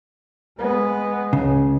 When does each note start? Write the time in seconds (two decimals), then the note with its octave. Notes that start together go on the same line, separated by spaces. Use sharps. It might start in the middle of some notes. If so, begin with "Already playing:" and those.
0.57 G#3 B3
1.33 C#2 C#3